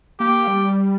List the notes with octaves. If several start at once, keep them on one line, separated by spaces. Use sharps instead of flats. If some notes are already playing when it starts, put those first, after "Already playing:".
A#3 G4
G3